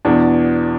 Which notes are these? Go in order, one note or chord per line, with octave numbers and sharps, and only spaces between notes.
E2 B2 D4